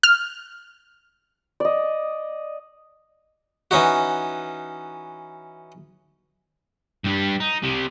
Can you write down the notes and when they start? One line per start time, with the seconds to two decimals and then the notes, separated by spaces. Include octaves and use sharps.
0.03 F6
1.60 D5 D#5
3.71 E3 C#4 D#4 F#4
7.04 G2 G3
7.40 D#4
7.63 C3 G3